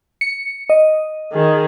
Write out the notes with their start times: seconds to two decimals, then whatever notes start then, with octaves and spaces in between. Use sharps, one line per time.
0.21 C#7
0.70 D#5
1.32 D#3 G#4